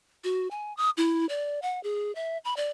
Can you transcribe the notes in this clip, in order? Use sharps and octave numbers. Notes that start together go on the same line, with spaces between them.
F#4
G#5
D#6
E4
D5
F#5
G#4
E5
B5
D5